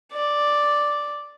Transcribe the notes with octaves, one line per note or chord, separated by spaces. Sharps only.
D5